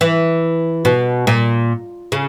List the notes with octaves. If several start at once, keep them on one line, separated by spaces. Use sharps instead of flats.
E3
B2
A#2
C#3